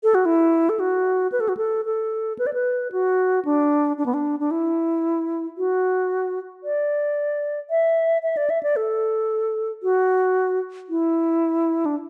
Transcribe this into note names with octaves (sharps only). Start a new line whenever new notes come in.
A4
F#4
E4
A4
F#4
B4
A4
F#4
A4
A4
B4
D5
B4
F#4
D4
D4
B3
D4
D4
E4
F#4
D5
E5
E5
D5
E5
D5
A4
F#4
E4
D4